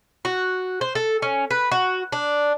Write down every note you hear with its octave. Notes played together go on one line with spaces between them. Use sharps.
F#4
C5
A4
C#4
B4
F#4
D4